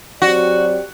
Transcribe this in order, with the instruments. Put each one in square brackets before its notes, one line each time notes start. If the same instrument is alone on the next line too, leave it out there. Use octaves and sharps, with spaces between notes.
[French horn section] F#3 C4 G4 D5 [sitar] F#4